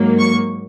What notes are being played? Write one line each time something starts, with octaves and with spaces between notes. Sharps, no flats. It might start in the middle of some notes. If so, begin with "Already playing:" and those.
Already playing: G#2 F#3 A#3
C#6